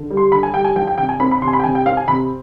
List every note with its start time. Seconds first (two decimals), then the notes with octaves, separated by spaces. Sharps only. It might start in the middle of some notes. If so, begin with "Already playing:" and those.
Already playing: D3
0.10 G3
0.17 C6
0.32 D3 B5
0.43 G#5
0.54 G3 G5
0.64 G#5
0.76 F3 G5
0.87 G5
0.98 C3 G5
1.09 G#5
1.20 C4 B5
1.31 B5
1.42 C3 C6
1.48 G#5
1.53 B5
1.60 G5
1.64 C3 G#5
1.75 G5
1.86 C4 F5
1.97 G#5
2.08 C3 B5